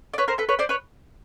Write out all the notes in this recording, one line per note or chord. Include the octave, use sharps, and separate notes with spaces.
D5
B4 C#5
A#4 C5
A4 B4
B4 C#5
C5 D5
B4 C#5